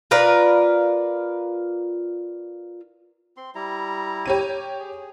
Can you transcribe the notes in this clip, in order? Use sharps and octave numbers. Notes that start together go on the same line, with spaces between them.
F4 A#4 B4 D5
C4 C6
G3 E4 A#5
G4 C#5 D#7
G#4